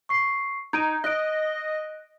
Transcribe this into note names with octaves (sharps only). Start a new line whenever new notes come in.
C#6 C7
D#4 G#6 D7 D#7
D#5 F#6 D7